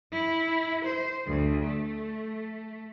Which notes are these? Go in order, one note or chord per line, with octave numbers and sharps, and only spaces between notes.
E4
C5
D2
A3